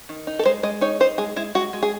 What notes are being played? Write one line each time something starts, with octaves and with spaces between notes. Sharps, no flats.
D#3
D#4
A4
G#3 C5
G#3 D#5
D#4 C#5
D#4 C5
G#3 G#4
G#3 E4
G#3 F#4
G#3
G#4